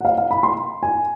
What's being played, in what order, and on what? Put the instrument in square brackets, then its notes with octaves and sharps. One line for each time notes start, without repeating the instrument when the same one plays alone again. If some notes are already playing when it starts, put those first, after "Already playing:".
[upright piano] F#5
F5
F5
B5
C6
G#5